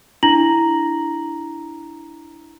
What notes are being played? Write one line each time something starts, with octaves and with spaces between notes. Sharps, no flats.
D4 E4 A#5 A#6 F#7